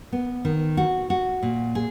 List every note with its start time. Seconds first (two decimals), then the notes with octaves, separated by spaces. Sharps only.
0.12 B3
0.45 D#3
0.77 F#4
1.10 F#4
1.43 A#2
1.75 G#4